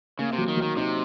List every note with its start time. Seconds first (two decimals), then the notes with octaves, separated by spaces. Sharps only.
0.19 C#3 A#3
0.33 C3
0.38 F#3
0.48 D#3
0.57 F#3
0.62 D#3
0.77 C3 D#4